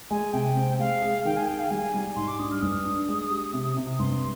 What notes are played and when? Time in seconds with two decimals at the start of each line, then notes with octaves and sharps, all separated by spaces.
0.10 G#3 G#5
0.33 C3 G5
0.57 C4
0.79 G#3 F5
1.02 G#4
1.25 D#3 G5
1.37 G#5
1.48 G#4 G5
1.59 F5
1.71 G3 G#5
1.94 G3
2.16 G#2 C6
2.28 D6
2.39 D4 D#6
2.51 F6
2.62 G2 D#6
2.85 D4
3.09 G#3
3.30 G4
3.53 C3
3.77 C3
3.99 G2 C6